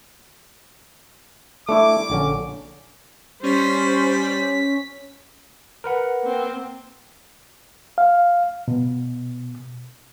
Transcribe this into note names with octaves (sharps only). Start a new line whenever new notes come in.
A3 D4 E4 D6
A#1 D3 C#4
G3 C#4 C5 B6
A#4 B4 F#5
A#3 C4
F5
B2